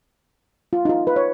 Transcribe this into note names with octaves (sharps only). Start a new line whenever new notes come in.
F4
D#4
F4
B4
C#5